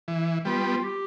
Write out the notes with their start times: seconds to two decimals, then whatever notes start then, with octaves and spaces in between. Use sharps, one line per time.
0.08 E3
0.45 G3 B3 F4
0.83 G4